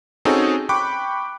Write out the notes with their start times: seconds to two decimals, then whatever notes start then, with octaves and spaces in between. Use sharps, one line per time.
0.25 C4 C#4 D#4 F#4 G#4 A4
0.69 G5 B5 C#6 D6 F#6